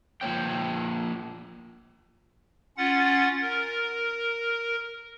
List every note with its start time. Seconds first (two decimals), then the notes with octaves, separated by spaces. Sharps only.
0.21 F3 A#3 C#5 G5
2.78 C#4 F4 F#5 A6
3.41 A#4